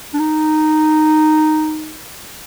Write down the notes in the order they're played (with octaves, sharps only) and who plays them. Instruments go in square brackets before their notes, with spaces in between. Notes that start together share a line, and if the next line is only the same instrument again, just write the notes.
[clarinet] D4
D#4